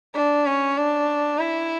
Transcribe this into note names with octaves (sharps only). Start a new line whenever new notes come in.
D4
C#4
D4
E4